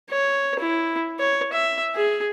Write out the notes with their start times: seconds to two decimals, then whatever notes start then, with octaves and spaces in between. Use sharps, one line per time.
0.11 C#5
0.60 E4
1.19 C#5
1.53 E5
1.95 G#4